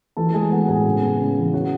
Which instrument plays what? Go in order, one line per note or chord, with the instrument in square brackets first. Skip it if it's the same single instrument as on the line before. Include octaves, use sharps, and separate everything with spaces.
[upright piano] E3 A4 A5
G#3 G#4 G#5
B3 F#4 F#5
A2 G#4 G#5
C#3
B3
C#3
E3
C#4 F#4 F#5